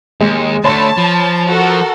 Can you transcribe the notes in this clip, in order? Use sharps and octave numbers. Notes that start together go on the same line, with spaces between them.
D#2 G#3
D2 A3 C#5 A5 B5 C6
F3
F#4 A4 A#4